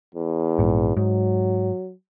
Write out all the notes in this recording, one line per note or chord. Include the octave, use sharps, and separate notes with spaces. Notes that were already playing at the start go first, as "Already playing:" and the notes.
E2
A#1 G#2
G#2 F#3